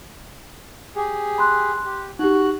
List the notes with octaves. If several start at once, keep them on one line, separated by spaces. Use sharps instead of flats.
G4 G#4
B5 C6 F#6
G4
D#4 F#4 G4 F#6